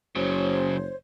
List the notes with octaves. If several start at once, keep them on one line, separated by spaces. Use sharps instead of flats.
F#1 C#3 F#3 C5 C#5